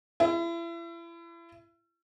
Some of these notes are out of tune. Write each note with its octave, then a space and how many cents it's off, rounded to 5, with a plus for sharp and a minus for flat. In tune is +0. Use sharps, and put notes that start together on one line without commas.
E4 +35